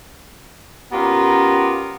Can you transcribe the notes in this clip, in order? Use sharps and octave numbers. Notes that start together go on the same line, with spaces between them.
B3 C#4 F4 G4 A#4 A#5